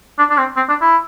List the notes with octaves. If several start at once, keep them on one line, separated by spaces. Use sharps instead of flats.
D4
D4
C4
C4
D4
E4